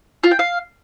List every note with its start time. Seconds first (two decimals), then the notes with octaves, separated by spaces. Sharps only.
0.24 F4
0.31 G5
0.39 F5